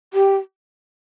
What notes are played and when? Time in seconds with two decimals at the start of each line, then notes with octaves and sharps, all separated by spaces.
0.14 G4